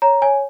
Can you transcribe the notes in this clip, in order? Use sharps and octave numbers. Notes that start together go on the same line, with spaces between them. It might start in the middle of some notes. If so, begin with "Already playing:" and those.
C#5 A#5
C#5 G#5